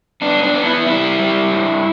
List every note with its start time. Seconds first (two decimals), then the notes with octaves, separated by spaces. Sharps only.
0.22 B3 D4
0.43 D4
0.54 B3
0.65 E4
0.86 G3 E4
1.19 G3
1.52 G2